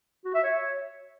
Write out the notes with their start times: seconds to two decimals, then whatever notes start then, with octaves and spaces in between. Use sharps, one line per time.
0.25 F#4
0.34 E5
0.44 C#5